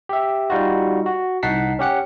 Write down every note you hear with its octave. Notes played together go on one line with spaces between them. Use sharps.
G4 E5
G3 D#4 F4 F#4
F#4
C2 D#4 F#5 A5 B6 C7
C#4 G4 F#5 C#7